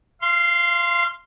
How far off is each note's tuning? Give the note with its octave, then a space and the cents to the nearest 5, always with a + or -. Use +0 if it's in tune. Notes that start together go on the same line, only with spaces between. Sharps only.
F5 -25 C6 +0